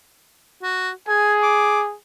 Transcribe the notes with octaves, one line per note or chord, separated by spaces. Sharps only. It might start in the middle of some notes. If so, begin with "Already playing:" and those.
F#4
G#4 G#5
D6